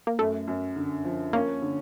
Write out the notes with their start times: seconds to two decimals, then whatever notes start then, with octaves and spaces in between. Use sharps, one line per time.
0.07 A#3
0.19 F#2 A3
0.48 F#2
0.76 D3
1.04 F3
1.33 A#3 C#4
1.62 D3